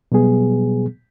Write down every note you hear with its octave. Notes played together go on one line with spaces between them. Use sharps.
B2 F#3 G3 B3 G#4